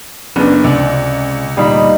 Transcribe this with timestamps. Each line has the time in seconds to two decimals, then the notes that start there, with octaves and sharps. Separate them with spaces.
0.36 F#1 B3 C#4 D4
0.64 C#2 C3 D5
1.57 D2 A#2 G3 D#4 F5 B5